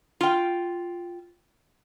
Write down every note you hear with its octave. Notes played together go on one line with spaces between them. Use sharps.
F4 G5